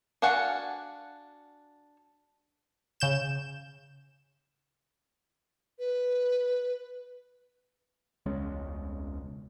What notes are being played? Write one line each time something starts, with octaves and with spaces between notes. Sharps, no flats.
D4 F#4 F5 F#5 G#5
C#3 G6 E7
B4
E1 C#2 G#3 C#4